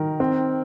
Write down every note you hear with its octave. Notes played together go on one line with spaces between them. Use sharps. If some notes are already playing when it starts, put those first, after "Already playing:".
Already playing: D#3 A#4
C4